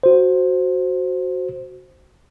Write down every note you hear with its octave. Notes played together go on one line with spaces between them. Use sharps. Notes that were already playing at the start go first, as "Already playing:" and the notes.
F#4 C5